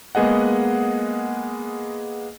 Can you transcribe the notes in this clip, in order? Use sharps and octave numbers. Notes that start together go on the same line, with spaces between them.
G#3 A#3 B3 G#4 D#5 F#5